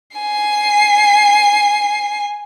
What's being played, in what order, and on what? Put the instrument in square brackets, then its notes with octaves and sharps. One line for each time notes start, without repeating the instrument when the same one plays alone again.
[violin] G#5 C7